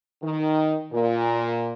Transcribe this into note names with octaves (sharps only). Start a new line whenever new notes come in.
D#3
A#2